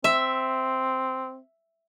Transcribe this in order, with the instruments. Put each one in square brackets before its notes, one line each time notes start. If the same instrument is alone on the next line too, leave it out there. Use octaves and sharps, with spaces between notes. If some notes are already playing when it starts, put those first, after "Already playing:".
[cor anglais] C4 [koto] E5